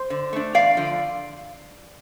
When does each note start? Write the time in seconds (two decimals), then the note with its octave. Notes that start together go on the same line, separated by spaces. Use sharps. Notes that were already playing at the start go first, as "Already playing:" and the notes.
Already playing: C5
0.10 D3
0.33 A3 D4
0.55 E2 D5 F5
0.77 D3 F3